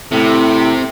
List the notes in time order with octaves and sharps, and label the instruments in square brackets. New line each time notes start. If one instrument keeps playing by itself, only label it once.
[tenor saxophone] A2 [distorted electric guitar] C3